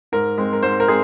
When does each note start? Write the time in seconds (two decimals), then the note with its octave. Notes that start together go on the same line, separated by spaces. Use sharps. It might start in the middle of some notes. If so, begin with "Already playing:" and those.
0.12 G#2 A#4
0.38 G#3 C4
0.53 A#4
0.63 G#2 C5
0.80 A#4
0.88 G#3 C4 G#4